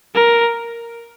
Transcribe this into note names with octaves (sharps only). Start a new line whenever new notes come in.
A#4